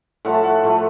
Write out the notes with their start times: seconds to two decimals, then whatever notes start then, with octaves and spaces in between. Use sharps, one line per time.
0.25 A2 F3 A3 F#5
0.34 A5
0.43 F#5
0.64 A2 F3 A3